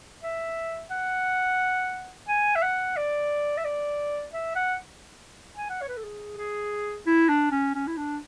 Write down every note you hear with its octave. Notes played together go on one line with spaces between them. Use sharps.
E5
F#5
G#5
E5
F#5
D5
E5
D5
E5
F#5
G#5
F#5
C#5
B4
A4
G#4
G#4
E4
D4
C#4
C#4
E4
D4